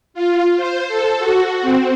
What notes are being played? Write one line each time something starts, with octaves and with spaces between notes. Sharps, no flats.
F4
C5
A4
F#4
C4